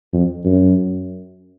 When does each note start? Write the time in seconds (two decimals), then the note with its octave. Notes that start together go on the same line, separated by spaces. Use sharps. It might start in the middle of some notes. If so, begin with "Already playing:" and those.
0.13 F2
0.45 F#2